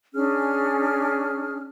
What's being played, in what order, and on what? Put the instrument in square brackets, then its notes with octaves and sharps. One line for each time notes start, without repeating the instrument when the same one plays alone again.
[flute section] C#4 D4 G#4 F6